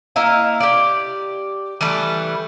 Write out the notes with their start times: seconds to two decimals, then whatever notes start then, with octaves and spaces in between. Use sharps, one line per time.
0.16 A#3 E4 D#5 F5
0.60 G4 D5
1.81 E3 G3 A3 B4